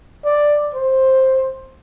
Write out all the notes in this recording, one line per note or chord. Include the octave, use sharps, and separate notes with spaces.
D5
C5